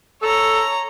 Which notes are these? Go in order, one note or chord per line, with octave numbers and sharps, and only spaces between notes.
A4 C#5 A#5